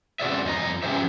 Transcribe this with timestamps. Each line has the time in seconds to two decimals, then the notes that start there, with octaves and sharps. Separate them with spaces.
0.20 C4 C#4 F#4 G#4 D5 E5
0.46 F2 D#5 A#5
0.83 F3 C#4 G4 G#4 C5 E5